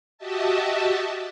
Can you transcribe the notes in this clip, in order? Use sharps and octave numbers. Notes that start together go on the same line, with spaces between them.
F#4 G4 D#5 E5 A5